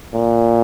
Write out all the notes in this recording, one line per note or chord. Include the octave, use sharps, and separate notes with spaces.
A#2